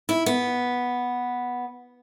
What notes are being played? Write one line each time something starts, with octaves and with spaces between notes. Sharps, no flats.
E4
B3